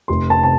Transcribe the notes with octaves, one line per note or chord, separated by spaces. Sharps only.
F1 C6
A5
C3 A5